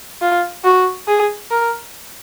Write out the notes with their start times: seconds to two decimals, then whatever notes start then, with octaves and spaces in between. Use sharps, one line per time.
0.21 F4
0.64 F#4
1.08 G#4
1.51 A#4